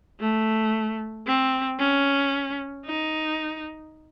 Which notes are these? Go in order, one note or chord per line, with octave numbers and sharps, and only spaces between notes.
A3
C4
C#4
D#4